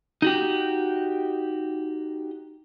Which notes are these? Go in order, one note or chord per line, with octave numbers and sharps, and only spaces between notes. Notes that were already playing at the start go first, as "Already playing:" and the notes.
D#4 F#4 G4